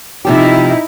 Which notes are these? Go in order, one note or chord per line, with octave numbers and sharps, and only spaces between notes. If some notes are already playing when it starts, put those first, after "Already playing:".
C3 F3 D#4 E4 G4